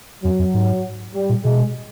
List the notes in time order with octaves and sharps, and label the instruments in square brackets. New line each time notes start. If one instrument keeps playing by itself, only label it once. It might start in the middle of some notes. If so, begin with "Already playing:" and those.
[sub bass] F2 [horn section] F#3
[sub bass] F2
G#2
[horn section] G3
[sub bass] A#2
[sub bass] B2 [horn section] G#3